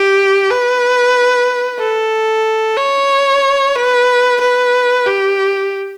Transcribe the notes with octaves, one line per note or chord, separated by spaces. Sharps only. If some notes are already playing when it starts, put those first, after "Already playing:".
Already playing: G4
B4
A4
C#5
B4
B4
G4